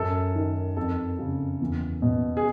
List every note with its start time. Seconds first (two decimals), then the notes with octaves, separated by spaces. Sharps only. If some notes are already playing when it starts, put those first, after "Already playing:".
Already playing: F#2 A4
0.35 D#3
0.77 F2 A4
1.19 C#3
1.61 E2
2.02 B2
2.37 G#4